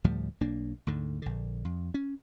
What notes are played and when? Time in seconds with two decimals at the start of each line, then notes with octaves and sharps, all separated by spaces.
0.04 D2 A2 F3 G3
0.41 B1 A#3 D4
0.87 D2 G#2 D3
1.22 A#1 D3
1.65 F2
1.94 C#4